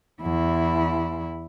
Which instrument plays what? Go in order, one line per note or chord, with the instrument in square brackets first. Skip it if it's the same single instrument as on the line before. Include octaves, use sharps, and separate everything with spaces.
[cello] E2 E4